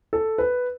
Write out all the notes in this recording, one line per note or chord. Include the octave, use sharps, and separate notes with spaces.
A4
B4